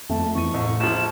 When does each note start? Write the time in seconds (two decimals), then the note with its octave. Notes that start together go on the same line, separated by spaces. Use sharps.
0.10 F2 A3 B3 A5
0.35 E2 C#6 D#7
0.54 C2 A2 D#5
0.80 A#1 F3 E7